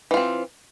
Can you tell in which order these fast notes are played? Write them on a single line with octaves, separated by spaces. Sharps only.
E3 F4 C4